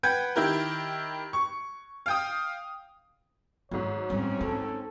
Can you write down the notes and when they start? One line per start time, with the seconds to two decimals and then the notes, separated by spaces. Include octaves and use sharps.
0.03 B4 F#5 G5 G6 G#6
0.36 D#3 E4 G4 A#4
1.33 C#6
2.06 F5 G5 D#6
3.71 G#2 D#3 F#3 C#5
4.10 A2 G3 C4 C#4
4.41 D#4 A4